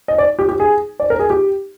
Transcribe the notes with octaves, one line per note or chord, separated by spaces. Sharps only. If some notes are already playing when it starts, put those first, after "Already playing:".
D#5
D5
G4
G4
G#4
D5
A#4
G#4
G4